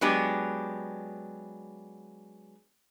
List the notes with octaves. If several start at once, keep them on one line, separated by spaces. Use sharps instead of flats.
F#3 G#3 B3 D4 G4